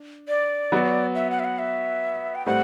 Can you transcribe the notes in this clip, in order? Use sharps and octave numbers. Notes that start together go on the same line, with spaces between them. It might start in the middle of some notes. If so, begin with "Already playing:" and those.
Already playing: D4
D5
F#3 B3 F#4
E5
F#5
E5
F#5
E5
G5
A2 G3 C4 F#5